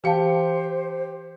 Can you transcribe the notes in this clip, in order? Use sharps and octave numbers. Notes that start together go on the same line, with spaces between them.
E3 G4 C5 F5 A5 C#7